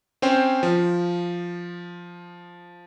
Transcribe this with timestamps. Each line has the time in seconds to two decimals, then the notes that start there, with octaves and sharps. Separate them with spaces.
0.22 C4 C#4 C5 G5
0.63 F3